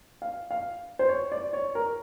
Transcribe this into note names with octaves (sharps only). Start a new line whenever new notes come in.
F5
F5
C5
C#5
D5
C#5
A#4